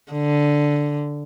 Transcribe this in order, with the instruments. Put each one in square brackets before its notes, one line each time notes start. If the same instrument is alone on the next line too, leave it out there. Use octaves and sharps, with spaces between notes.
[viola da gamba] D3